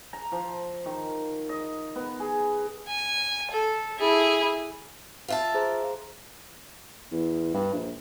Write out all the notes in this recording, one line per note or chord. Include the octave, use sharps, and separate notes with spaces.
A#5
F3
D#3
D#5
B3
G#4
G#5
A4
E4 G#4
F4 E5 A5
G#4 C5 A#5
E2
G2
A#1